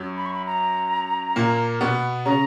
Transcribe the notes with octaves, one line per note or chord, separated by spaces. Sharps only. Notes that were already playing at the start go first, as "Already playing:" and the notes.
Already playing: F#2 F#3
B5
C#6
B5
A#5
A#2 A#3
B2 B3
C#3 C#4 A#5